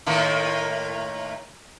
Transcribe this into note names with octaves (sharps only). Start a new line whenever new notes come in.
A2 D#3 A#3